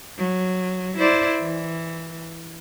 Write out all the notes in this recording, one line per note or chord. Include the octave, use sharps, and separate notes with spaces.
F#3
E4 C5 D5
E3